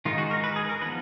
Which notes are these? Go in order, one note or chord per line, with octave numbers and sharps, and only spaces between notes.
D#3 G#3 D#4 F4
F#4
A#4
B4
G#4
A#4
F3 B3 D#4 B4